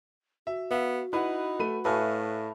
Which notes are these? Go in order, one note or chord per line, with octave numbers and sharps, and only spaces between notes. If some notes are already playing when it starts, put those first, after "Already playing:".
F#4 E5
B3 E5 F5
D#4 E4 B4 F#5
A3 B5 D#7
A2 A3 B4 F5 G#5 C#6